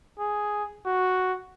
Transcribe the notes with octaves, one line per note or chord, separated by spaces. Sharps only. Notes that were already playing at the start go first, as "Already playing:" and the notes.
G#4
F#4